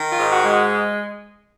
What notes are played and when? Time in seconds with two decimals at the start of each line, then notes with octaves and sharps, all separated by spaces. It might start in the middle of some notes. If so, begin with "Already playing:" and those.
Already playing: D#3
0.12 F4
0.18 G#2
0.31 F#4
0.44 G#3
0.50 F#4